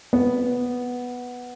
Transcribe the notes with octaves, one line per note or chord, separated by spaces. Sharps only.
B3